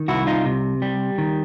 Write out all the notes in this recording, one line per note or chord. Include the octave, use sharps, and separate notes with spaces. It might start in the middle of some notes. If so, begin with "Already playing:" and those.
Already playing: D#3
C2 E4 F#4
D#4 F4
C3
G3
D#3